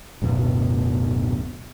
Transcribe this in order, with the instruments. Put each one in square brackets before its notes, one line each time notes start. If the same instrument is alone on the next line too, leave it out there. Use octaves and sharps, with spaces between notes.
[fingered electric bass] D1 F#2 B2 B3